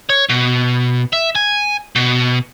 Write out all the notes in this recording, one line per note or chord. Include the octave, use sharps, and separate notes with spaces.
C#5
B2
E5
G#5
B2